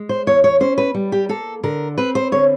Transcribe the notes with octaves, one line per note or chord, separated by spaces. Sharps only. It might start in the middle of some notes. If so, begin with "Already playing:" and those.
Already playing: G#3
C5
E2 C#5
C#5
C#4 C5
B4
G3
G4
A#3 A4
D3 A#4
C4 B4
C5
D3 C#5